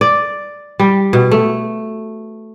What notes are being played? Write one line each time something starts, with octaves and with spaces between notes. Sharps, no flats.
D5
G3
B2
A3